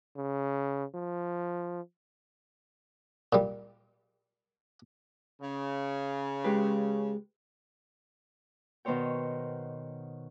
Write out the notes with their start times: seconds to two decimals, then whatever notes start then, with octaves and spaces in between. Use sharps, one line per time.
0.17 C#3
0.95 F3
3.33 A#2 G3
5.41 C#3
6.44 G#3 G4 B4
8.85 B2 D#3 B3 C5 C#5 G5